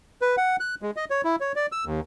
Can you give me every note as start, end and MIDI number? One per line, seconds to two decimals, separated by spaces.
0.22 0.36 71
0.37 0.56 78
0.60 0.75 90
0.82 0.91 56
0.96 1.05 75
1.10 1.21 73
1.25 1.36 64
1.40 1.52 73
1.56 1.66 74
1.72 1.85 88
1.85 2.00 39